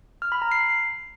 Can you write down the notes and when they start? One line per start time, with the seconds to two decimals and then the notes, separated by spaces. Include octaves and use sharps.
0.22 F6
0.32 B5
0.42 A#5
0.52 C7